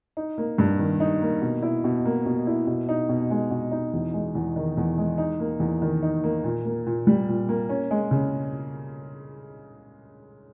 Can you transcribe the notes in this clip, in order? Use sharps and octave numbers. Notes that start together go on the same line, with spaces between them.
D#4
A#3
G2
D#3
D#4
A#3
B2
E4
B2
A#3
B2
E4
B2
D#4
B2
G#3
B2
D#4
E2
G#3
E2
D#3
E2
G#3
D#4
A#3
E2
D#3
D#4
A#3
A#2
A#3
A#2
G3
A#2
A#3
C#4
G#3
C#3